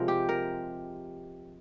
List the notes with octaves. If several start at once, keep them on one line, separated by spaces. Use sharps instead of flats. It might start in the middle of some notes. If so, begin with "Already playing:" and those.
Already playing: C3 F3 G#3 A#4
G4
A#4